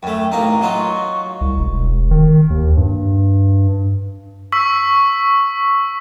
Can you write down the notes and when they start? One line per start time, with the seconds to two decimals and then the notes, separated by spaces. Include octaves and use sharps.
0.03 F#2 A3 G5
0.32 A1 A#3 D#4 A#5
0.61 F#3 D#4 F4
0.79 C#6
1.41 C2
1.59 E1
2.11 D#3
2.50 D#2
2.77 G2
4.52 C#6 E6 B6